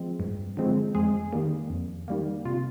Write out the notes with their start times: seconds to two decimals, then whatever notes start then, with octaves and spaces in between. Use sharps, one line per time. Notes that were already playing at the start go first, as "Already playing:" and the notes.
Already playing: F3 G#3 C4
0.20 G2
0.57 D3 F3 G#3 C4
0.95 F2 G#3 G#4
1.33 D#3 G3 A#3
1.70 F2
2.08 D#3 G3 A#3
2.45 C3 F4